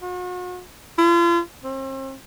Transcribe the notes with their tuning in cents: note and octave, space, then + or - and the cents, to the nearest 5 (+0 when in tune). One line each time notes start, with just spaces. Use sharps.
F#4 -40
F4 -40
C4 +40